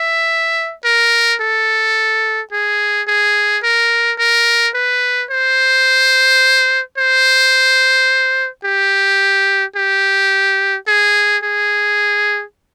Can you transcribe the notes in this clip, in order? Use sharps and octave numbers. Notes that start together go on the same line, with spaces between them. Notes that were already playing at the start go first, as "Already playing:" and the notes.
Already playing: E5
A#4
A4
G#4
G#4
A#4
A#4
B4
C5
C5
G4
G4
G#4
G#4